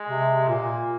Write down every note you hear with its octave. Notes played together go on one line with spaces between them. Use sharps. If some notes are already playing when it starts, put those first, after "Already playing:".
Already playing: G#3
C3
A#2 A#3